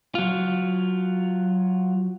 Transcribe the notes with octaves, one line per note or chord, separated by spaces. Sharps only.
F#3 F4